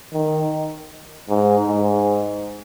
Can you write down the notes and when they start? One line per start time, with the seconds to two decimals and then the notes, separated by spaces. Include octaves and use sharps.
0.13 D#3
1.29 G#2
1.68 G#2